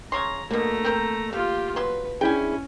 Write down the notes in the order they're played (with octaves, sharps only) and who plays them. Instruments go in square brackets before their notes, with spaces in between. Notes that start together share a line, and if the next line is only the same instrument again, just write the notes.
[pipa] C#3 C#5 C6 [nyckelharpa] A#5
[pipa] B2 D3 [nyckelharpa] A3 A#5 [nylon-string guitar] A#3
[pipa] C4 A#4 C5
[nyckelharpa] F4 G4 [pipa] F5
[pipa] F#3 C6 [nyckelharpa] B4
[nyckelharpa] C#4 [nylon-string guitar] D4 E4 G#4 [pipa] G5 G#5